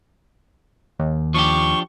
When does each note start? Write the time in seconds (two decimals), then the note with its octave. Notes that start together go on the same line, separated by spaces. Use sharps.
0.99 D#2
1.34 F3 D4 G4 C#6